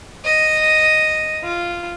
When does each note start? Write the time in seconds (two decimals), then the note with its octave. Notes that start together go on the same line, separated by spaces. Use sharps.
0.25 D#5
1.44 F4